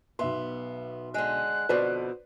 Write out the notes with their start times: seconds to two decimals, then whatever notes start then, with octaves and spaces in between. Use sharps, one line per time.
0.19 B1 B3 E5 C6
1.14 D3 G#3 F#6
1.69 F2 B2 D3 B4 C5 D5